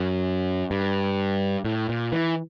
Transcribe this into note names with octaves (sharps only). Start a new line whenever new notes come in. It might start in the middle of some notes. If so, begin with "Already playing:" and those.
Already playing: F#2
G2
A2
A#2
E3